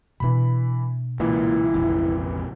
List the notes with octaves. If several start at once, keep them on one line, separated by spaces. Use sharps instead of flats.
B2 E3 D4 B5
C#2 A#2 E3 E4
F1 A#1 F2